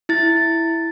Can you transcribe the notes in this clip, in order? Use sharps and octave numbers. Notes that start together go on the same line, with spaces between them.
E4 A6